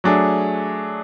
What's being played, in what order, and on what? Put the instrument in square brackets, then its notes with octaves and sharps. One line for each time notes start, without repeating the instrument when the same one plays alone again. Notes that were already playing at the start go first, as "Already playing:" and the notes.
[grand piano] F#3 A3 D4 G#4